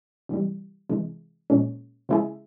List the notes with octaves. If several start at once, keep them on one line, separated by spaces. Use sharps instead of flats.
C3 E3 G3
C3 E3 G#3
A#2 F3 G#3 C#4
C#3 F3 G#3 E4 G#4